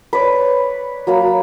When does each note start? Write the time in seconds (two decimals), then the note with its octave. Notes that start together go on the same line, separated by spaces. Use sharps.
0.13 B4 C#5 D5
1.07 F#3 A#3 B5